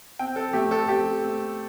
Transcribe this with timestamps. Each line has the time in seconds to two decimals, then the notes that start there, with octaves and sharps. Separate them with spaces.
0.19 C4 G5
0.36 A4
0.53 A3 G4
0.71 A4
0.88 C4 G4
1.24 A3